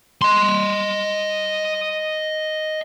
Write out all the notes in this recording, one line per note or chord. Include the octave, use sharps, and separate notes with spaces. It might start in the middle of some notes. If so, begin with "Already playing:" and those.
D#5 C6